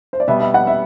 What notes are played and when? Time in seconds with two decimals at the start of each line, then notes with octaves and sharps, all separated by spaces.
0.13 C5
0.20 D5
0.27 B2 G3 B3 E5
0.40 E5
0.54 F#5
0.67 E5